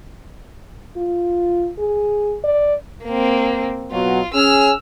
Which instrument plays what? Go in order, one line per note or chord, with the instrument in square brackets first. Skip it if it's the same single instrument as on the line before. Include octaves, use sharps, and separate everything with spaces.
[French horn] F4
G#4
D5
[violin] A#3 C4
[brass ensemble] B2 F#3 [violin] F4
[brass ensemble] C#4 G#4 G#5 [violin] E6 F6